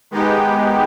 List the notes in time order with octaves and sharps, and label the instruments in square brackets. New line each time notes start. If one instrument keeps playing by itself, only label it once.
[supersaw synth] D#3 G#3 B3 D#4 G4